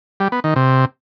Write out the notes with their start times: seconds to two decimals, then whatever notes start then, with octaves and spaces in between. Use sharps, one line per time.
0.20 G3
0.32 B3
0.44 D#3
0.56 C3